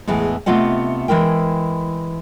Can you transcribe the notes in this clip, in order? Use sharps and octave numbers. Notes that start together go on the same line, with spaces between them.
E2 A2 E3 G#3
C3 A3 B3 F4 D#5 F#5
E3 G#3 E4 A#4 G5